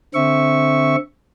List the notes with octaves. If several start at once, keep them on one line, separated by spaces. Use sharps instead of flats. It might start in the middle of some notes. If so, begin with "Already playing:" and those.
D3 C4 E5 C#6